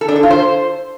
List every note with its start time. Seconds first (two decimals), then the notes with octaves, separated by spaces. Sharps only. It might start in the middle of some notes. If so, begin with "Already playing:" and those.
0.01 A4
0.08 D4
0.16 A4
0.23 F4
0.30 C5